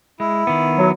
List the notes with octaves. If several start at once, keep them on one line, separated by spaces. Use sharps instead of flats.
G#3 E4
D#3 B3
F#3